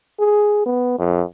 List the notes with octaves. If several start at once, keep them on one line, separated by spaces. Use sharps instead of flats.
G#4
B3
F2